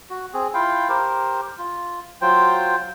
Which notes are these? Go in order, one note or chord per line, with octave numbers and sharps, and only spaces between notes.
F#4
C4 G#4
E4 F4 F5 G5
G4 A#4 C5
F4
F#3 F4 C5 G5